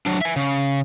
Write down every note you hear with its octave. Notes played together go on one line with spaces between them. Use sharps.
F#3 D4
E5 G#5
C#3